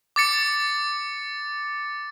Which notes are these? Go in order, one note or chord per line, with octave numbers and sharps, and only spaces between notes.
D6 A6 C#7